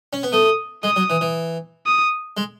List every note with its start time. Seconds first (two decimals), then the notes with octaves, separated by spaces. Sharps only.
0.13 C#4
0.23 B3
0.33 A3 D#6
0.83 G#3 D#6
0.96 F#3
1.10 E3
1.21 E3
1.86 D#6
2.37 G#3